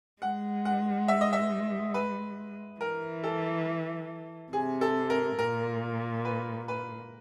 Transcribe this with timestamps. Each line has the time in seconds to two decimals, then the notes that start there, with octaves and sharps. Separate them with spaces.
0.22 G#3 F#5
0.65 F#5
1.08 E5
1.21 D#5
1.33 E5
1.94 B4
2.80 E3 A#4
3.24 A4
4.52 C3 G#4
4.81 A4
5.10 A#4
5.39 A#2 A#4
6.25 B4
6.68 B4